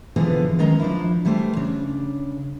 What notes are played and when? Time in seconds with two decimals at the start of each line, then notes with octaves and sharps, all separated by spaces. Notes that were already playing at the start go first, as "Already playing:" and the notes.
0.16 B2 D3 E3 F3 B3 G#4
0.59 D#3 G#3 C#4 D#5 A#5
0.80 F3 D4 E4
1.25 E3 G3 A3 G4 C5
1.57 C#3 D4